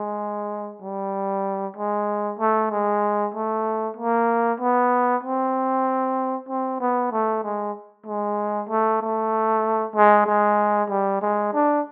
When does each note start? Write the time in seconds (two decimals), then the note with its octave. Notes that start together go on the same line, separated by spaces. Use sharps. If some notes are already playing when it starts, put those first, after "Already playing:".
Already playing: G#3
0.82 G3
1.76 G#3
2.39 A3
2.71 G#3
3.34 A3
3.96 A#3
4.60 B3
5.23 C4
6.49 C4
6.80 B3
7.12 A3
7.43 G#3
8.06 G#3
8.69 A3
9.01 A3
9.96 G#3
10.27 G#3
10.90 G3
11.21 G#3
11.53 D4